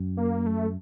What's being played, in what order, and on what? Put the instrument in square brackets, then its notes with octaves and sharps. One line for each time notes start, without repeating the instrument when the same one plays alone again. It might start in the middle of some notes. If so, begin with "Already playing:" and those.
Already playing: [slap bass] F#2
[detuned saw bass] A#3
A3